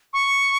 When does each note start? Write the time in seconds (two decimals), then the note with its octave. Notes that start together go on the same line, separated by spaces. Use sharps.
0.13 C#6